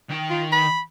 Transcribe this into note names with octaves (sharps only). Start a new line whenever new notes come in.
D#3 G5
F4
B5